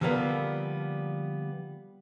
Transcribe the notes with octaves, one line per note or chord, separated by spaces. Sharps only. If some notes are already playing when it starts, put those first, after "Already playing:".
D3 F3 G3 A#3 B3 A4